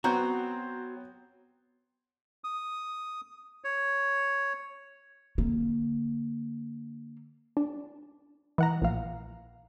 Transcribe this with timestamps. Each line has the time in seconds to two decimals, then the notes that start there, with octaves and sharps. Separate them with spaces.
0.04 F#3 B3 C4 F#4 A#5 G6
2.44 D#6
3.64 C#5
5.38 D3 A#3
7.57 D4
8.58 E3 F#5 A#5
8.82 A#1 F5